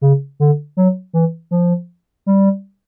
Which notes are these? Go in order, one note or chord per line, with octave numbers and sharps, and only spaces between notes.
C#3
D3
F#3
E3
F3
G3